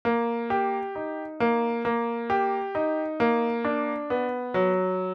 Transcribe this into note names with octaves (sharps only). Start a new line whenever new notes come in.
A#3
G4
D#4
A#3
A#3
G4
D#4
A#3
D4
B3
F#3